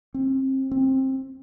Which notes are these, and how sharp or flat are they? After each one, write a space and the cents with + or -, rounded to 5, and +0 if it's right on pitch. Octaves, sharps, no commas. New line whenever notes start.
C4 +30
C4 +20